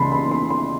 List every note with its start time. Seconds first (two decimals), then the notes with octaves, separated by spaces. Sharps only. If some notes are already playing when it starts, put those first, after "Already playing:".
Already playing: C#2 C#3 E3 A5 B5 C6
0.12 B5
0.31 C6
0.50 C6